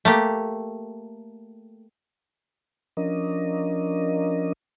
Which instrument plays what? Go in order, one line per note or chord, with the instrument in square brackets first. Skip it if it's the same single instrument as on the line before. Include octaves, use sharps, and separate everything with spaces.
[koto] A3 A#3 G4
[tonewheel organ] F3 C#4 D4 A#4 D#5